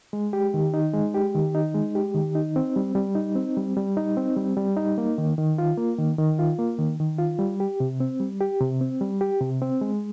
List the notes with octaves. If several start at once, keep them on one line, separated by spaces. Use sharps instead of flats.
G#3
G4
D#3
D#4
G#3
G4
D#3
D#4
G#3
G4
D#3
D#4
C4
G3
G3
D#4
C4
G3
G3
D#4
C4
G3
G3
D#4
A#3
D#3
D#3
F4
A#3
D#3
D#3
F4
A#3
D#3
D#3
F4
G3
G4
C3
C4
G3
G4
C3
C4
G3
G4
C3
C4
G#3